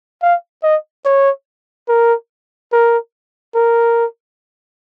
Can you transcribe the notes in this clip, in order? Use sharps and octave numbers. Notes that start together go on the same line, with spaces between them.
F5
D#5
C#5
A#4
A#4
A#4